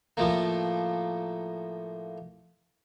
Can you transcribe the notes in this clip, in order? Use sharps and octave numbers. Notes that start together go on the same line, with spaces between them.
A2 F3 A3 A#3